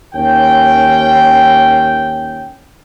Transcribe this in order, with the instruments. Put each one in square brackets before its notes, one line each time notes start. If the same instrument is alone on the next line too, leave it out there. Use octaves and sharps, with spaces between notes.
[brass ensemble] D#2 C#4 G5